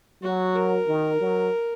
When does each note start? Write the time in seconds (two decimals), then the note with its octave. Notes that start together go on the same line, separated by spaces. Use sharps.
0.22 F#3 F#4
0.55 A#4
0.88 D#3
1.20 F#3